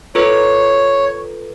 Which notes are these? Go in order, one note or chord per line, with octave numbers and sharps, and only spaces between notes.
F4 A4 B4 C#5